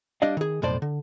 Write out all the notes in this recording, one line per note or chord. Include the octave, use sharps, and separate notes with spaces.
G3 D4 D5 D#5 F5
D#3 G#4
B1 F2 A2 C5 D5
D3